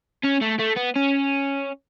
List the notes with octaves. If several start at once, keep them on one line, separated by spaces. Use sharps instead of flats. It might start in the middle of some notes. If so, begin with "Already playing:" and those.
C#4
A3
A3
B3
C#4